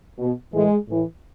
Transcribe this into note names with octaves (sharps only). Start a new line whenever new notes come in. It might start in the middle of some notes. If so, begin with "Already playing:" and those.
B2
A2 E3 G#3
A2 E3